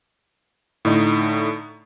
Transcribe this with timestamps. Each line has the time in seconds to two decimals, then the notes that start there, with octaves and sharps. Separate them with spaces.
0.85 A2 D3 A3 D#4